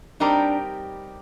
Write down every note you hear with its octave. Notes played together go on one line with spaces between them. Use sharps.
G3 C4 D4 D#4 G4 A#4